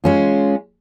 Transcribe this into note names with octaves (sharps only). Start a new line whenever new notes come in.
G#3 C#4 F4